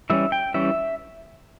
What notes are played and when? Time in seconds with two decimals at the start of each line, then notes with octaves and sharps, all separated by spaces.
0.10 E3 G3 C#4 E5
0.32 G5
0.54 E3 G3 C#4 E5